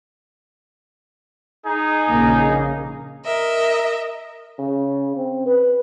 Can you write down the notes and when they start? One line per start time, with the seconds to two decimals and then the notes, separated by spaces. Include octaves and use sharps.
1.66 D#4 G#4
2.08 A#1 C#3 A#3
3.24 A#4 D#5 E5
4.59 C#3
5.16 C4
5.46 B4